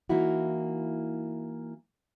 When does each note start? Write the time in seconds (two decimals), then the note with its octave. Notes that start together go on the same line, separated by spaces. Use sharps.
0.09 E3 A#3 D#4 E4 F#4